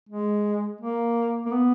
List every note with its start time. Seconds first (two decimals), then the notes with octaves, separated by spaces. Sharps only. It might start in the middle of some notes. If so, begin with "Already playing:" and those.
0.09 G#3
0.81 A#3
1.46 A#3
1.53 B3